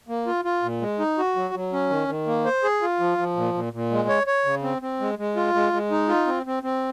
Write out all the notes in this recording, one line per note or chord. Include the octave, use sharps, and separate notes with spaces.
A#3
F4
F4
A#2
G#3
D#4
F#4
F#3
F#3
C#4
D#3
D#3
A#3
C5
G#4
F4
F3
F3
A#2
A#2
A#2
G#3
C#5
C#5
C#3
C4
C4
G#3
G#3
F4
G#3
G#3
D#4
F4
C4
C4
C4